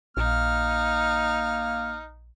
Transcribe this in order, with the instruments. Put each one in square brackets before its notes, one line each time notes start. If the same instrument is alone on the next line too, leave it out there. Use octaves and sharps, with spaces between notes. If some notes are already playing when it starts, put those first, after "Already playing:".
[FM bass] A#1 [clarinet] A#3 [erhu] D#4 [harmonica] F6